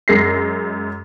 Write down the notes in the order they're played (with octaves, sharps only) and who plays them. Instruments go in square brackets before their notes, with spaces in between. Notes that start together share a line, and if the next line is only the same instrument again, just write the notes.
[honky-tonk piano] F#2 G#3 A#6 C7